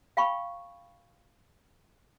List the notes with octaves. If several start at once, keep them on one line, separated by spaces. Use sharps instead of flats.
F5 G5 B5 C#6